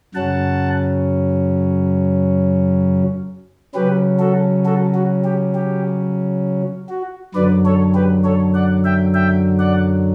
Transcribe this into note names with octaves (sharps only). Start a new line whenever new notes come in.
F#2 C#3 F#3 C#4 F#5 A5
C#3 F#3 C#4 G4 B4
F#4 A4
F#4 A4
F#4
G4
G4
F#4
F#2 D3 F#3 B4 D5
A4 C#5
G4 B4
A4 C#5
D5 F#5
E5 G5
E5 G5
D5 F#5